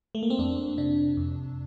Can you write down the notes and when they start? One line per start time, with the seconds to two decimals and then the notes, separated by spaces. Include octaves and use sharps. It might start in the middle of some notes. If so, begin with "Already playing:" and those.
0.15 A3
0.23 A#3
0.30 C4
0.39 F2 D4
0.78 C3 D4
1.17 F2